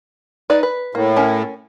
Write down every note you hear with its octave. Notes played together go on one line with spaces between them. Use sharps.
D#4 B4 D5
B4
A2 A#3
C#4 A#4